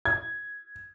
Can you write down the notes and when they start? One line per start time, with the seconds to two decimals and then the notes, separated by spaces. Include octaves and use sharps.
0.05 G#6